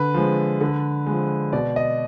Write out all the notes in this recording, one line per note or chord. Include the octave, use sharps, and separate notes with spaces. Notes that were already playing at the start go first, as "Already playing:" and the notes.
Already playing: D3 B4
F3 G#3
D3
F3 G#3
B2 D5
D#5